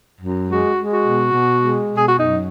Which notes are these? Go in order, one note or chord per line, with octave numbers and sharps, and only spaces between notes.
F#2
G#3 F#4
G#3
F#4
B2
B2
G#3
B2
G#4
F#4
F#2 D#4